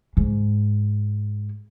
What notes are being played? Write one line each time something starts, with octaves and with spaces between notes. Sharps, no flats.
G#2